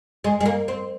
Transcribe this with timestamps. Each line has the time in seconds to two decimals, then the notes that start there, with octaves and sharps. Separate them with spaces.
0.24 G#3
0.40 G#3
0.46 A#3
0.68 C4